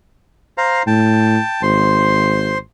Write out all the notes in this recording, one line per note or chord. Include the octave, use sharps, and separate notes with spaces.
C5 F5 A#5
A2 G5 A5
G#1 C5 C6